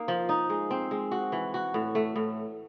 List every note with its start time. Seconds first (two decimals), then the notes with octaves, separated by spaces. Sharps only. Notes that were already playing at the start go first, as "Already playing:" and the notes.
Already playing: A#3 D#4
0.08 F3
0.29 D#4
0.50 G#3
0.71 C4
0.91 G#3
1.12 F#4
1.32 E3
1.54 F#4
1.74 A2
1.95 A3
2.16 A2